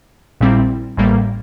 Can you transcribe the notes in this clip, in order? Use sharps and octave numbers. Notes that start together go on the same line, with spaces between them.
A#1 A#2 G3 C4 E4
A1 A2 G3 A#3